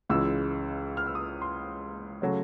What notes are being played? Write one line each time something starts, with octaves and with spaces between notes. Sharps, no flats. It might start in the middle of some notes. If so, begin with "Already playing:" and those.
C#2 C#3 E3 G#3 E6
F6
E6
D#6
C6
C#3 F#3 A3